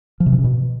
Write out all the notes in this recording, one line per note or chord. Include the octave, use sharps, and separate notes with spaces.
F3
C3
E3
C#3
B2